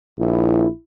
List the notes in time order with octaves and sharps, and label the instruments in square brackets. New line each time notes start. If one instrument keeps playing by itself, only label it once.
[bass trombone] A#1 [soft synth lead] E4